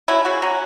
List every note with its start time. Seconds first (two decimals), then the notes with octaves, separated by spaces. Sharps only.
0.08 F#3 C#4 E4
0.25 C#3 F#4
0.42 F#3 C#4